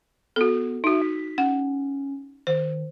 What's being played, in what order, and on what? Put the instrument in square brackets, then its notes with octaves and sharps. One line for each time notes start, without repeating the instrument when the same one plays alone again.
[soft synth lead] B3 [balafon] F#4 A4
[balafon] D#4 F#4 [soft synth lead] E5
[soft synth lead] B6
[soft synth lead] C#4 [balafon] F#5
[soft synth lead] D#3 [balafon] C5